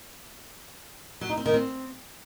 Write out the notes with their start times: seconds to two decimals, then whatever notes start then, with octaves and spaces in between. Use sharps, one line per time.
1.21 F#3
1.29 D#4
1.38 C4
1.46 D#3
1.54 C4